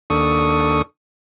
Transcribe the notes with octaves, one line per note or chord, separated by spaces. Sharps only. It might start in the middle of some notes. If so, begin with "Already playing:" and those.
D#2 D4 A4 C#6 D#6